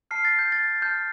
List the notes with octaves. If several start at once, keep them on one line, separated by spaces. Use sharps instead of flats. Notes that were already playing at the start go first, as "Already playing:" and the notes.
A5 F6 C7
A6
G6
A6
A5 F6 G6